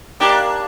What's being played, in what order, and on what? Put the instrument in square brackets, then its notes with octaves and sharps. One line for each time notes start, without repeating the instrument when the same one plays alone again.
[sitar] A#3 D4 [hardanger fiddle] G4